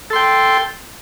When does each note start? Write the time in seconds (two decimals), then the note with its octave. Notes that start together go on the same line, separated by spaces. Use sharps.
0.10 A4
0.13 C6
0.16 G5